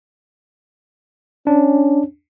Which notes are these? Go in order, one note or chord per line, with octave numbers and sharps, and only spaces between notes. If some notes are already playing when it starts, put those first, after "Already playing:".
C#4 D4